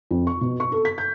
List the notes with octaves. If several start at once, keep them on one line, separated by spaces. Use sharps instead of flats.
F2
C#6
B2
C#6
A4
B6
G6